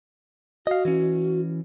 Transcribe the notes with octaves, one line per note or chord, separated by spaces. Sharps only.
F#4 D#5 F5
E3 C#4